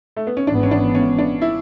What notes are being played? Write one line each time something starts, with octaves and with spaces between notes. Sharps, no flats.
A3
B3
C#4
G#1 G#2 E3 B3 D4
C#4
D4
C#4
D4
E4